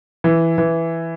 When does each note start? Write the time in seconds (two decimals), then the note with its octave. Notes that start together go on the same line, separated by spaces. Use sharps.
0.24 E3
0.58 E3